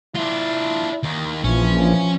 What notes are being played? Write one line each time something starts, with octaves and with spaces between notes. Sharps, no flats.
D4 E4 F4
D#2 D#3
A#1 E3 F3 C#4